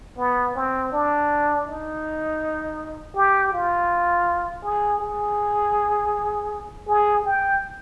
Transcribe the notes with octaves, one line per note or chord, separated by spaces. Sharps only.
B3
C4
D4
D#4
G4
F4
G#4
G#4
G#4
G5